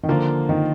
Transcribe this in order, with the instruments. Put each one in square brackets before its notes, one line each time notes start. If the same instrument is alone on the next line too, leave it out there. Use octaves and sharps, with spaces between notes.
[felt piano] D#3
[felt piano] D3 [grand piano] F3 A#3 D4 F4 A#4
[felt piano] D#3